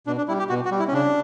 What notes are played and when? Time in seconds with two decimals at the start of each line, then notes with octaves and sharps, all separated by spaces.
0.07 B2 D4
0.18 D4
0.28 G3 E4
0.39 G4
0.49 B2 F#4
0.65 F#4
0.71 G3
0.79 E4
0.88 C#4
0.93 C#3 D4